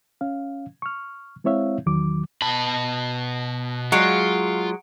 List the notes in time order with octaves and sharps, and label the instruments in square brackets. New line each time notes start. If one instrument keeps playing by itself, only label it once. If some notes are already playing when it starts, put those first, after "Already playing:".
[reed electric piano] C#4 F5
C#6 F6
G#3 C4 E4 C#5 E5 F5
E2 D#3 F#3 D6
[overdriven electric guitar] B2 B5 [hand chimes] A5
[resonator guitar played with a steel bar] F#3 G#3 [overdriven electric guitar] F4 [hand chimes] F#5 C#7 D7